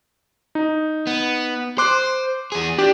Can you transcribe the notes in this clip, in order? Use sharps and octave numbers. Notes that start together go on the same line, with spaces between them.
D#4
B3
C5 C6 D6 F#6
E2 G#4
D4 G4